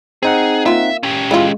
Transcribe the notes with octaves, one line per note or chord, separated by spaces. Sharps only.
C4 D#4 G#4 F#5
A#3 F4 E5
C#4 G4
E3 F3 G#3 F4